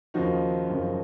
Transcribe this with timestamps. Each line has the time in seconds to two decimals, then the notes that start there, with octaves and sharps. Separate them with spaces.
0.14 D#2 C#3 F3 D#4 F#4
0.69 F#1 F#2 C#3 F3